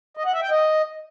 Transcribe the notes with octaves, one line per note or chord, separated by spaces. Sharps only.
D#5
F#5
E5
G5
D#5